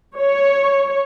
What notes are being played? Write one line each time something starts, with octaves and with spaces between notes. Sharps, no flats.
C#5